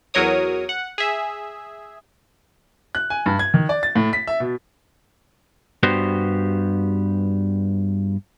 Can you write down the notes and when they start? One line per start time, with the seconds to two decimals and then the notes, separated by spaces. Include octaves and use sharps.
0.14 E2 F#3 A#4 C#5 D#6
0.69 F#5
0.98 G#4 E5
2.95 F#6
3.10 G#5
3.26 G2
3.39 G#6
3.54 D#3
3.69 D5
3.83 A6
3.96 A2
4.13 B6
4.28 E5
4.40 B2
5.83 G2 B3 F#4 G4 C5